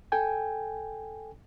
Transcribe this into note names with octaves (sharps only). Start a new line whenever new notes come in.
A4 G5 G#5